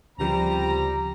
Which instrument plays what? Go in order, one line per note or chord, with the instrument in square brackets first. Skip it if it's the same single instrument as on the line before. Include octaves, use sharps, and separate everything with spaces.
[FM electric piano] D2 C#3 F3 [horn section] G3 C4 A#5